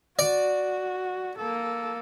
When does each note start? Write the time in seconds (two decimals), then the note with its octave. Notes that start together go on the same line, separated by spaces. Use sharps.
0.19 F#4 D5
1.38 A#3 A4